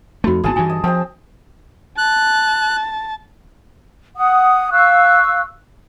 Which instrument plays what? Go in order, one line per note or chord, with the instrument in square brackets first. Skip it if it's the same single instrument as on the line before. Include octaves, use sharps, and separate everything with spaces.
[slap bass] F2 A3 [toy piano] D#4 F#4 B5
[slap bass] G#1 E3 B3 [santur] G#4 A5
[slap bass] G2 E3 [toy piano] G#5
[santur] D#5
[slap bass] F3 [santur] C4 D#5 [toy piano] A5
[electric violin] A5 [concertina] F#6
[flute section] F#5 D#6
F5 C#6 E6 F#6